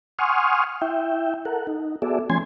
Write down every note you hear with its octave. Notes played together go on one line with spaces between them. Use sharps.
F#5 G#5 C6 C#6 D#6 F6
E4 E5 G5
A4 A#4 F#5
D#4
B3 F#4 G#4 A4 D5 E5
F3 A3 C#4 G#5 C6 G#6